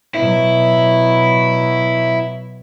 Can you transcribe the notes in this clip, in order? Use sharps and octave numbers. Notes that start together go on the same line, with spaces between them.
B2 F#3 E4